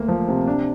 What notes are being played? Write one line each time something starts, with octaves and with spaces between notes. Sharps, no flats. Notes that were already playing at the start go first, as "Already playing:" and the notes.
Already playing: D2 A#3
F3
C3
D4